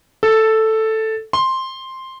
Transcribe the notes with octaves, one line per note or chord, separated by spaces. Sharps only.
A4
C6